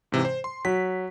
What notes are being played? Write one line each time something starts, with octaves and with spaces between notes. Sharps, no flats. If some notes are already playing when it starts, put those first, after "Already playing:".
G#2 C3 E3
C5
C6
F#3 B6